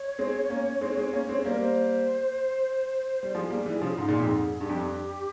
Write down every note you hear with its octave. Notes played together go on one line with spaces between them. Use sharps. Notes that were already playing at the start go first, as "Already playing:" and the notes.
Already playing: C#5
G#3 C4
A#3 C#4
G#3 C4
G#3 C4
A#3 C#4
G#3 C4
G3 A#3 C5
A#4
C5
G3
F3 G#3 G#4
G3 A#3
E3 G3
C#3 F3
G#2
A#2
F2 G#2
G2 G4
F2
G2